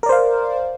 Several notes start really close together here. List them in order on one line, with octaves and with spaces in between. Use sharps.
A#4 D5 C5 F5